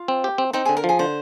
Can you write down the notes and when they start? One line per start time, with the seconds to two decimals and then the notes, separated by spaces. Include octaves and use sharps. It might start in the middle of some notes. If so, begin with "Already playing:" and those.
Already playing: F4
0.08 C4
0.24 G4
0.38 C4
0.53 C4 D#4
0.65 G#4
0.69 D3
0.77 A#4
0.84 F3 G#4
0.99 D3 C5